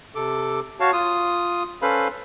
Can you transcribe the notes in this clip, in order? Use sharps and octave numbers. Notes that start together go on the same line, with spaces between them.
C3 A4 D6
F#4 C#5 F5 A5
F4 D#6
C#4 A4 B4 C5 F5 B5